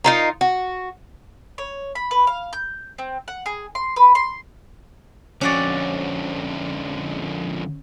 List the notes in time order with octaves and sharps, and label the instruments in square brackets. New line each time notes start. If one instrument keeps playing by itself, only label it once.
[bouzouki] D#4 F4 A#4
F#4
[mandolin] C#5
B5
B4
F5
G6
C4
F#5
G#4
C6
B4
C6
[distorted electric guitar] F2 D3 [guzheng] C#4 F#4 D5